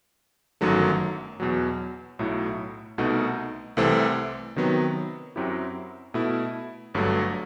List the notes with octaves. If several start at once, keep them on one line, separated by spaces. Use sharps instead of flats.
G1 F#2 D#3 F#3 A3
E2 B2 F#3
B1 A2 F#3 A3 E4
C2 B2 A3 D#4 F#4
C2 C3 E3 A3 C4
C3 D#3 F#3 B3
F#2 F#3 C4 E4 G4
B2 A3 E4
G1 G2 F#3 A3